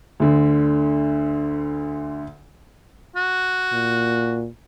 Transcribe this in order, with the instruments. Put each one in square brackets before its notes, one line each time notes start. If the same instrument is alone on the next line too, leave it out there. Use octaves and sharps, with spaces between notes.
[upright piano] D2 D3
[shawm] F#4
[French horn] A#2